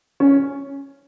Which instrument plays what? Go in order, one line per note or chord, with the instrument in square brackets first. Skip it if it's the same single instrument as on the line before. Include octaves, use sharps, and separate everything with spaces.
[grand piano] C#4